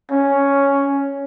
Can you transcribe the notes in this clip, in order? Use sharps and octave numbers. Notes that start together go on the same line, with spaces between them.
C#4